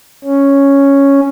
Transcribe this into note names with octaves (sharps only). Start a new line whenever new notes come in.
C#4